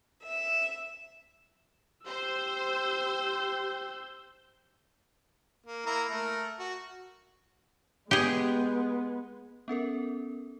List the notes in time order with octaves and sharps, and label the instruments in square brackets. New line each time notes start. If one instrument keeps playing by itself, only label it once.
[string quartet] E5
[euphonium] G4 [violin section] C5 [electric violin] E6 G6
[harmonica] A#3
A#3 E4 A#5
A3 A#4
F#4
[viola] G#3 B3 [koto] G4 G#4
[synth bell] B3 C#4 A4 A#4